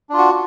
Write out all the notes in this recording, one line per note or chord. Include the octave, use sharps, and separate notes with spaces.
D4 F4 F#4